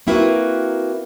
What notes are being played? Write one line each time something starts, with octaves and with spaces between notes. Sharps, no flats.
A#3 C4 E4 F#4 A#4 B4